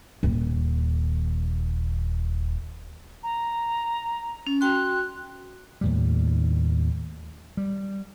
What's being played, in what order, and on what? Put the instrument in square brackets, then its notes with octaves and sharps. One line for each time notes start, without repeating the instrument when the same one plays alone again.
[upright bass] D#1 D#2
[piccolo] A#5
[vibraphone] C#4
[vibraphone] F#4 G5 C6 [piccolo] F#6
[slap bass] D#2 A2 G3
G3